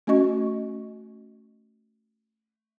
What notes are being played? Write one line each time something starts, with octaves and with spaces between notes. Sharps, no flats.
A3 C#4 F#4 D#5 C#6